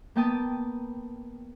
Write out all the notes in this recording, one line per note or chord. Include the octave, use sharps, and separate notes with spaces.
A#3 B3 G5 A5 D#6